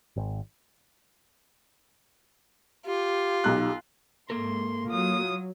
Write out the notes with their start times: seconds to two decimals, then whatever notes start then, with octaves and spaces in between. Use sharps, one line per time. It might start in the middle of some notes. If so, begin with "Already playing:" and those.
0.16 G#1
2.86 F4 G4
3.44 B1 D#4 F#6
4.30 G#2 A#3 A4 A#4 C6
4.87 F#3 F4 D#6